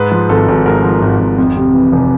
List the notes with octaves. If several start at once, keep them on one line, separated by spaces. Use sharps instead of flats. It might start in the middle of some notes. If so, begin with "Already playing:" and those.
Already playing: G#2 B4
F3
G#1 A4
G#1
G#2 A#4
F3
G#1
G#1
F2
C3
E3
F1